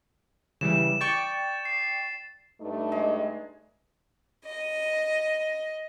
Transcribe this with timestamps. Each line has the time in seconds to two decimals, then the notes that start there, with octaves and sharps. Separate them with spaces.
0.61 C#3 E3 G3 E7
1.01 D5 G5 C#6 A6
1.65 C7
2.60 G2 A3 D#4
2.92 G#3
4.46 D#5